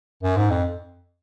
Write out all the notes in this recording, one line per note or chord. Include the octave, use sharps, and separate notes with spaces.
F#2
G#2
F2